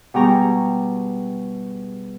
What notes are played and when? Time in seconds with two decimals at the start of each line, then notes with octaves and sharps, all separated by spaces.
0.14 B2 G3 G#4 G5 A#5 C#6